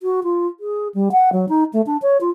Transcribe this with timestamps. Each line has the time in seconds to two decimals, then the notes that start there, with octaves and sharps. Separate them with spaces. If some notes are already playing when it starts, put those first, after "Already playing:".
0.03 F#4
0.24 F4
0.60 G#4
0.95 G3
1.12 F#5
1.33 F#3
1.49 D#4
1.73 A3
1.86 D4
2.02 C#5
2.21 F4